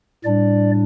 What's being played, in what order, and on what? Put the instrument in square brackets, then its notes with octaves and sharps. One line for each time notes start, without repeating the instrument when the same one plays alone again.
[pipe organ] A2 G3 D4 D5